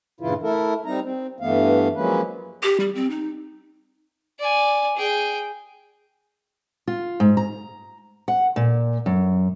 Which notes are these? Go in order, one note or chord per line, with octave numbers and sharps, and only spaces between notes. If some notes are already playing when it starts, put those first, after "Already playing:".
G2 A#2 C#3 E3 E4 F4
A3 E4 A4 A#4
G3 C4 D#4 A#5
C4
G2 E3 A3 B3 F5
F3 F#3 G#3 A#3 C#4 B4
G4
G3
C4
D#4
D5 G#5
G#4 G5
F4
G#2
A#5
F#5
A#2
F#2